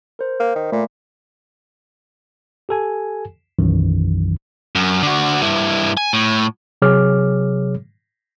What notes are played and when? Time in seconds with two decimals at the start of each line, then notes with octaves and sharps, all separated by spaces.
0.19 A#4 C5
0.40 A#3
0.56 D#3
0.72 A#2 A3
2.69 G4 A4 G#5
3.59 B1 F#2 D#3 E3
4.75 F#2
5.03 D3 F#4
5.41 G2 E4
5.97 G#5
6.13 A2
6.82 C3 F#3 G#4 C#5 D6 F6